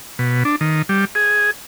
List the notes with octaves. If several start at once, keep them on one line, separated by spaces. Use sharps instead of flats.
B2
D4
D#3
G3
G#4